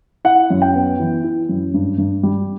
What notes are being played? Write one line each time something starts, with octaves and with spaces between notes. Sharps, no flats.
E4 F#5
F#2
G5
B3
E3
E4
F#2
G2
G2
G3